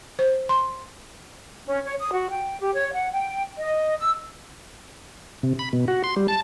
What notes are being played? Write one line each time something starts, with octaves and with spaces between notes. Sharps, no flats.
C5
C6
C#4
C#5
D#6
F#4
G5
G4
C#5
F#5
G5
D#5
E6
C3
B5
B2
F#4
C6
G3
A5